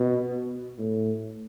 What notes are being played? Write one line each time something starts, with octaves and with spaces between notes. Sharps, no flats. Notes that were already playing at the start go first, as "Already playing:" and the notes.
Already playing: B2
A2